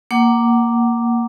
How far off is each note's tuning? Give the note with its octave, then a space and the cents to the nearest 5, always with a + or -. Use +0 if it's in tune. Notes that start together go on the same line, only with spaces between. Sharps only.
A#3 +0 F#5 +25 D6 +0